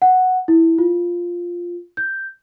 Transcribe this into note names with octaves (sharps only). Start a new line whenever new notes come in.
F#5
E4
F4
G6